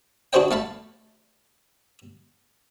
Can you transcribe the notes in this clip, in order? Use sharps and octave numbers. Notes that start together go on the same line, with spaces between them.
D4 F#4 G#4 C5 D#5 G5
A3 F5 A5 B5